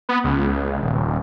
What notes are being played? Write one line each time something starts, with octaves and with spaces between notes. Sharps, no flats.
B3
C#2
D#1